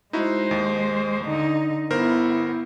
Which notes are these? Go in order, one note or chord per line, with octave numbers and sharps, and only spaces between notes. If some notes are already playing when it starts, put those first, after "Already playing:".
G#3 D#4 E4 F#4 C5
D#2
D3 D#4
G1 B3 E4 A#4 C5